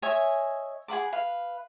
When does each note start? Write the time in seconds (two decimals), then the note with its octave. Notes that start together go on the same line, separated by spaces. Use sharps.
0.02 C#5 D#5 E5 G#5
0.88 G#4 F#5 B5 D6
1.12 B4 F5